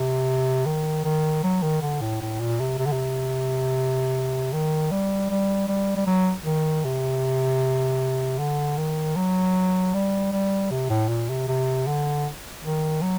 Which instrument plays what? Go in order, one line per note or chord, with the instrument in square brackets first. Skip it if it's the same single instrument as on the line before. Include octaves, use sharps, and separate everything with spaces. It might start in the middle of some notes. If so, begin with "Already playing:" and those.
Already playing: [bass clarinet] C3
D#3
D#3
F#3
D#3
D3
A2
A2
A#2
C3
C3
D3
C3
D#3
G3
G3
G3
G3
F#3
D#3
C3
D3
D#3
F#3
G3
G3
C3
A2
A#2
C3
C3
D3
D#3
F#3